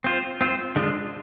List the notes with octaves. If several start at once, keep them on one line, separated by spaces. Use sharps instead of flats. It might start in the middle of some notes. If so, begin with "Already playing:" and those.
C4 F4 C5
C4 F4 C5
D3 G#3 D4 F4